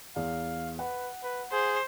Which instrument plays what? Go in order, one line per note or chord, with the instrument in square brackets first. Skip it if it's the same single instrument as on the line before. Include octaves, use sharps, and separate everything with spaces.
[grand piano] E2 [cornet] F5
[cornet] B4 [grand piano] F#5
[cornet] B4
[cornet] G#4 [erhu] C5